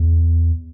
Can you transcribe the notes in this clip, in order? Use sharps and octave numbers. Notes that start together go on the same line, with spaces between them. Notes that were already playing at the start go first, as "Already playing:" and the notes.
Already playing: E2